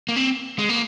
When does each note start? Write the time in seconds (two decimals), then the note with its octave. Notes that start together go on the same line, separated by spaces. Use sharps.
0.09 A#3
0.16 C4
0.59 G#3
0.69 A#3